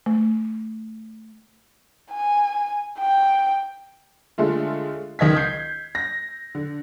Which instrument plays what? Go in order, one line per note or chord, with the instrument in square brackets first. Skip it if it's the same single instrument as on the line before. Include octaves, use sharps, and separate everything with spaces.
[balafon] A3
[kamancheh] G#5
G5
[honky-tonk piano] D3 G#3 A3 F4
C#2 D#3 D#5 G#6 B6
G6 G#6 C7
A#6
D3